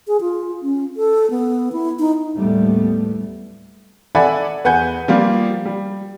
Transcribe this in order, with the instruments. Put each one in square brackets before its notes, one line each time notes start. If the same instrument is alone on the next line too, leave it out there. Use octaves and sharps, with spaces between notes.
[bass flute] G#4
F4
C#4
A4
B3
E4
D#4
[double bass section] D#2 A2 G3 A3 B3
[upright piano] A4 D5 E5 F#5 G#5 B5
E2 B4 F#5 G#5 G6
F3 G3 A#3 F4
G3